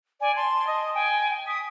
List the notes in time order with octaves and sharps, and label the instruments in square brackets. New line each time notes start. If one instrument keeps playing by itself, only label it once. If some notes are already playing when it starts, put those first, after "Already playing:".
[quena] D5 [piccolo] G#5
[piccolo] A5 [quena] C6
[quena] D#5
[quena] G5 [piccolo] G#5
[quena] D#6 [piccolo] B6